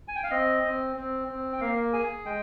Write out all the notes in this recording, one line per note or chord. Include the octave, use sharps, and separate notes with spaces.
G#5
G5
F5
C4 D#5
C4
C4
C4
G5
A#3 F5
G#4 G#5
G#3 G5